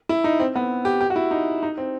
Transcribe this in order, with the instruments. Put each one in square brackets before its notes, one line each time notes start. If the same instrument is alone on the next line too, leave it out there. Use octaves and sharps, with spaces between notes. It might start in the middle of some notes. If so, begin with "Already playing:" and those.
[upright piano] E4
D#4
C4
B3
G4
G4
F#4
E4
D#4
D#4
C4